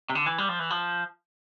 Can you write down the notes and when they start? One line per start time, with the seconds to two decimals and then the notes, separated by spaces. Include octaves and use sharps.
0.10 C3
0.15 D3
0.26 E3
0.38 G3
0.49 F3
0.59 E3
0.70 F3